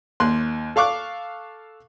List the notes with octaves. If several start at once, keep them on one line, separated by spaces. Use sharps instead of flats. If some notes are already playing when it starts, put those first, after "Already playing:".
D#2 C6 F#6
A4 F5 C#6 D6 F#6